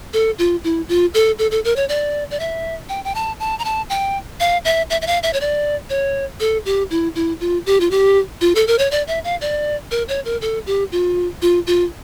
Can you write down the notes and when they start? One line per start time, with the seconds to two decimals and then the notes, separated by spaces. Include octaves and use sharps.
0.13 A4
0.39 F4
0.64 E4
0.89 F4
1.14 A4
1.39 A4
1.51 A4
1.65 A#4
1.76 C#5
1.89 D5
2.31 D5
2.40 E5
2.89 G5
3.05 G5
3.15 A5
3.40 A5
3.59 A#5
3.65 A5
3.90 G5
4.40 F5
4.65 E5
4.90 E5
5.02 E5
5.07 F5
5.23 E5
5.33 C#5
5.41 D5
5.90 C#5
6.40 A4
6.66 G4
6.91 E4
7.15 E4
7.40 F4
7.66 G4
7.80 F4
7.91 G4
8.41 F4
8.55 A4
8.67 A#4
8.79 C#5
8.91 D5
9.08 E5
9.24 F5
9.41 D5
9.91 A#4
10.08 C#5
10.25 A#4
10.41 A4
10.66 G4
10.92 F4
11.42 F4
11.67 F4